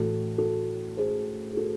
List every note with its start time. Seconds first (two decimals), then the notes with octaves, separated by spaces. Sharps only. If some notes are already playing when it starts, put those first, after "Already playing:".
Already playing: A2 E3 F#4 A4
0.38 F#4 A4
0.97 G#4 C5
1.53 G#4
1.57 F#4 A4